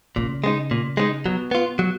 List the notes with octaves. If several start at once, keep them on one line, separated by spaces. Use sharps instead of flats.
A#2 C#3
G#3 B3 D#4
A#2
G#3 B3 D#4
B2 F#3
B3 F4
F#3